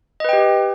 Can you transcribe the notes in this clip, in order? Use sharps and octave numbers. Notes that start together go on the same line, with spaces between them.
G4 B4 D#5 G5